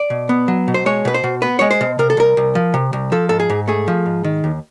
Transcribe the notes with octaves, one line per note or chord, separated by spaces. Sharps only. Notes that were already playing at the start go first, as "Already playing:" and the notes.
Already playing: D5
B2
B3
F#3
B2
C5
G#3 C#5
B2 B4
C5
B2
B3 B4
G#3 C#5
C5
B2
C3 A#4
A4
C2 A#4
C2
F3
C3
C2
F3 A4
G#2 A4
G#4
G#2
A3 G#4
F3
G#2
D#3
D#2